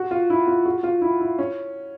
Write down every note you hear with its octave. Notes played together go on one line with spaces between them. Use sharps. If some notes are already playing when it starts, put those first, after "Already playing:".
Already playing: F#4
F4
E4
F4
F#4
F4
E4
E4
C#4